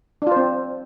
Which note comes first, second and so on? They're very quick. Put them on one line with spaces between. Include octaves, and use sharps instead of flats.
D4 F4 C5 C4